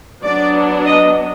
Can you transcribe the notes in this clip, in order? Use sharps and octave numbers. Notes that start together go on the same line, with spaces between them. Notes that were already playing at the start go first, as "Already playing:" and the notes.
F#3 B3 D4 D5
D#5